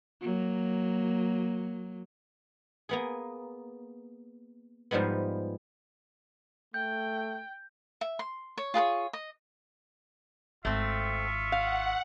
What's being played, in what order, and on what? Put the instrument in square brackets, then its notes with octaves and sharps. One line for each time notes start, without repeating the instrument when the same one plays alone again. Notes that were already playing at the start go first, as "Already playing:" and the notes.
[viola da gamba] F#3 A#3
[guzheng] A#3 B3 G#4
G#2 F3 G3 G#3 B3
[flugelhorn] A3 [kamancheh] G5 [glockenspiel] G6
[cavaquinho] E5
C6
C#5
F4 G#4 B4 C#5
D#5
[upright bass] G#1 [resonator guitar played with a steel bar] A3 C4 [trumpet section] F4 E5 C#6
[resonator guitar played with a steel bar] F5 [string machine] F#5